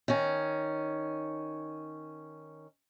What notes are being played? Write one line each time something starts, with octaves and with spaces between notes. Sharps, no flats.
D#3 C#4